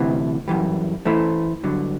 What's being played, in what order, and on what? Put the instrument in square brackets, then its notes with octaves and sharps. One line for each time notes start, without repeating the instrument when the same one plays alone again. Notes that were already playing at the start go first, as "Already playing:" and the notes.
Already playing: [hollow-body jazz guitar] D2 C3 E3
F#2 E3 G3
E3 A3 E4 A4 C5
G2 D3 F#3